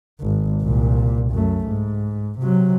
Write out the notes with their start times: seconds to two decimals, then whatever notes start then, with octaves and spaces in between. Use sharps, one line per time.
0.21 G#1
0.62 C2 A#2
1.31 F#2 A3
1.67 G#2
2.39 C3 F#3